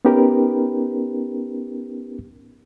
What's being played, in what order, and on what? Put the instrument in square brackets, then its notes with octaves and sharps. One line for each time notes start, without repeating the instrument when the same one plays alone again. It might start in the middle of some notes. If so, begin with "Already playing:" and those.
[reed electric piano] B3 C#4 D#4 G4 A#4 B4